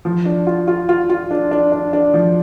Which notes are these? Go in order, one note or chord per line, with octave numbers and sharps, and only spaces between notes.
F3
D4
F4
F4
F4
F4
D4
D4
D4
D4
F3